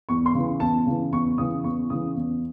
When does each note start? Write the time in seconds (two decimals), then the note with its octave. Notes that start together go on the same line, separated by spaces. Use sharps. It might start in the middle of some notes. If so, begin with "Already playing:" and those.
0.09 E2 C#6
0.26 C6
0.35 C#3 E3
0.60 E2 A5
0.87 C#3 E3
1.12 E2 C#6
1.38 C#3 E3 D#6
1.64 E2 C#6
1.90 C#3 E3 D#6
2.16 E2